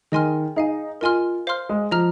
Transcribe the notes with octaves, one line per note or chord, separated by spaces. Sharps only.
D#3 G#4 D#5 G#5 C6 F6
D#4 G#4 F5 G#5
F4 A#4 D#5 G#5 C6 F6
C5 F5 C6 F6
G#3
F3 D#5 A#5 F6